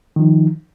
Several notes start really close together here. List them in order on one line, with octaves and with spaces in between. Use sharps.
D#3 F3 D#4